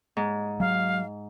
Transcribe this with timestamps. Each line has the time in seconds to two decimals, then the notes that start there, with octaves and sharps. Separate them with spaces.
0.17 G#2
0.60 F#3 G#3 F5